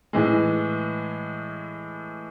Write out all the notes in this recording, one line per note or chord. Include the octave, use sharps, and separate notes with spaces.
A2 E3 G#3